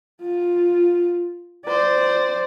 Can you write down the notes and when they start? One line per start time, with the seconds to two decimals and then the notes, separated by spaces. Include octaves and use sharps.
0.22 F4
1.66 C5 D5